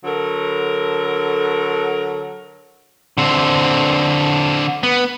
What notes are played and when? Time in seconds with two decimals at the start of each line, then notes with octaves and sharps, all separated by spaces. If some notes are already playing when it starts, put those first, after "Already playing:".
0.04 D3 F#3 A4 A#4
3.18 D3 C4
4.83 B3